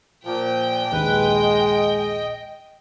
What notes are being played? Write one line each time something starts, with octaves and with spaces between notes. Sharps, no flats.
A#2 F3 G5
A#1 D#2 G#3 B4
D#5